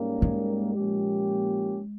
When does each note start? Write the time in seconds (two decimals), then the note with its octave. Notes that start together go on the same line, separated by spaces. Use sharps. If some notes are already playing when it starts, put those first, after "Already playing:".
Already playing: G#2 G3 A#3 C#4
0.22 G#3
0.75 A#2 F3 A#3 C#4 G4